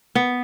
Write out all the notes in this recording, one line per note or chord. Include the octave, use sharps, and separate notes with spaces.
B3